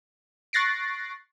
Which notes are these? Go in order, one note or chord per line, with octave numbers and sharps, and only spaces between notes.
C#6 F#6 A6 A#6 C7 D7